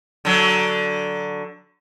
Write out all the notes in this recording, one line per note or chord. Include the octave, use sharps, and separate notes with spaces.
D3 F#3